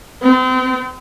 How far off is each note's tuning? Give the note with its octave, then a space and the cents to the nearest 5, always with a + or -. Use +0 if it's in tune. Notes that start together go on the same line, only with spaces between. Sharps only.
C4 -40